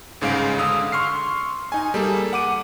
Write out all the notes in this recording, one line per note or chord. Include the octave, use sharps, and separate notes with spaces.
G1 G#2 C#3 G#3 F5 D7
D3 F5 D#6 E6
C6 C#6 F6 C7
D#4 G#5
G3 A#3 G#4 A4
F#5 D6 D#7